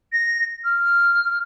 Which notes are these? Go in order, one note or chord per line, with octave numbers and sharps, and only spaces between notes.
A#6
F6